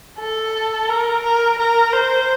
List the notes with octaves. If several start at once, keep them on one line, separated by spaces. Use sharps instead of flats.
A4
A#4
A#4
A#4
C5